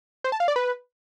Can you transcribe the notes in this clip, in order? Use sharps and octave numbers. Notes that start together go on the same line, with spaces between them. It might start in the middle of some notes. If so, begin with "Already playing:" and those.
C5
A5
F5
D5
B4